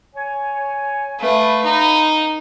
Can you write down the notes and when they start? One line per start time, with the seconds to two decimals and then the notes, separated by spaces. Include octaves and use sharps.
0.16 C#5 G#5
1.20 A3 B4 F5 B5
1.64 D#4